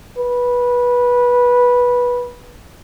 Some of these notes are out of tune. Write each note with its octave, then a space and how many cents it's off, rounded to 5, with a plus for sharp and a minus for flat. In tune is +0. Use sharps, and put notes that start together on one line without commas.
B4 -15